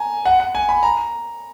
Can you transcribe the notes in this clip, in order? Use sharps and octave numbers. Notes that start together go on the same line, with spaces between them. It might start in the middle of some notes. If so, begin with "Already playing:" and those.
Already playing: G#5 A#5
F#5
F#5
G#5
B5
A#5